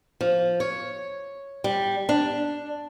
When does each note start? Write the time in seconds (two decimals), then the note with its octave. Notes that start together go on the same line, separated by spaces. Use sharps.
0.21 F3
0.60 C#5
1.64 G3
2.09 D4